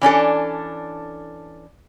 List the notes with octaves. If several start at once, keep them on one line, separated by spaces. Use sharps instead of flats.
E3 C#4 D4 A4